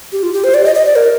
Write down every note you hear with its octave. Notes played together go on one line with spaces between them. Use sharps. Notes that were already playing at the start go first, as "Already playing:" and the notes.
G4
F4
G4
C5
D5
D#5
D#5
D5
A#4